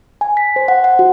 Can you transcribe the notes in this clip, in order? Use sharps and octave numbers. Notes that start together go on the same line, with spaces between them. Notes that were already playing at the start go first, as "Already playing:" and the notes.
G#5
B6
C5
F#5
F#5
F#4